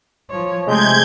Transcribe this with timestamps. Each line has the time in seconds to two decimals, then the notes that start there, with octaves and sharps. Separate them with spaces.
0.31 F3 C#5
0.67 C3 G#3 A3 G6 G#6